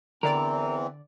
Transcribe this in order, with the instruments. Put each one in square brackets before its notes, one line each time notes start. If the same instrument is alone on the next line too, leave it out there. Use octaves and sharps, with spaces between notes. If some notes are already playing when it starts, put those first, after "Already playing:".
[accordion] E2 E3 C4 [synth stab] D3 D5 [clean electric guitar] A#4